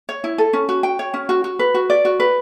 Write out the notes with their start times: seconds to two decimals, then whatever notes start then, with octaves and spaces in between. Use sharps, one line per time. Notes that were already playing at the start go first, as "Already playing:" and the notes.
0.09 C#5
0.24 E4
0.38 A4
0.53 C#4
0.69 F#4
0.83 G5
0.99 C#5
1.14 C#4
1.29 F#4
1.44 F#4
1.59 B4
1.74 F#4
1.90 D5
2.05 F#4
2.20 B4